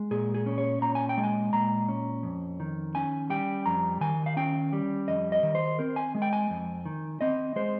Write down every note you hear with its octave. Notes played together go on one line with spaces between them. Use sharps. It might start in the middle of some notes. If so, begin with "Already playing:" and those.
Already playing: G#3
A#2 G#4
G#4
C#4
C#5
A#2 A#5
G#5
G5
G#3
G#5
A#2 A#5
C#4
F2
D#3
C#4 G#5
G3 G5
F2 A#5
D#3 G#5
F5
C#4 G5
G3
F2 D#5
D#5
D#3
C5
C4 A#4
G#5
G#3
G5
G#5
F2
D#3
C4 D#5
G#3 C5